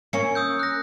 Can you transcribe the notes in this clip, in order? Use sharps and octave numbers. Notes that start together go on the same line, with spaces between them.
A#3 C#4 C#7
D#6 E6 G6
F#6 A#6